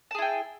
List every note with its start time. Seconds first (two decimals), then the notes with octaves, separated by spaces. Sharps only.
0.11 A5
0.15 G#4
0.18 E4
0.22 G5